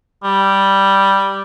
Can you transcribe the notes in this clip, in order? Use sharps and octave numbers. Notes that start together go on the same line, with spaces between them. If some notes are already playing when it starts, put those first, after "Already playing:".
G3